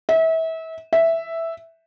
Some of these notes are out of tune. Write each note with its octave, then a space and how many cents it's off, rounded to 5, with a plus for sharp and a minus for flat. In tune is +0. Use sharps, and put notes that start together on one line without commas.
E5 -30
E5 +0